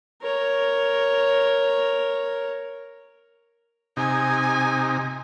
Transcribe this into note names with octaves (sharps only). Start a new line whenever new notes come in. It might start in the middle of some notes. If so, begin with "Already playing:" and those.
A#4 C#5
C3 D#4 G#5